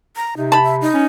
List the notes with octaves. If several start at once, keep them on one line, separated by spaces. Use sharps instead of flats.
A#5
C3 D#4
A5 B5
E5
D#4
C#4